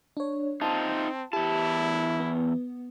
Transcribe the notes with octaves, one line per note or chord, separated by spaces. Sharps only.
D4 C#5
C4 D#4 F4 A5
E2 E4 G4 A5
B3